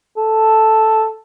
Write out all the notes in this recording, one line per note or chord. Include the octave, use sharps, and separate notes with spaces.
A4